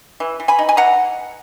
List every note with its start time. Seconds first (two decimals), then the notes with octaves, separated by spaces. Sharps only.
0.20 E3
0.40 E3
0.48 G#5 B5
0.59 D#4
0.69 G#5
0.77 E3 F#5 A#5